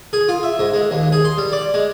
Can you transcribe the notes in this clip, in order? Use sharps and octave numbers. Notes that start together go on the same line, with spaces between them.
G#4
F4
E5
G#2
G#3
D#2
G#4
C6
G3
D5
G#3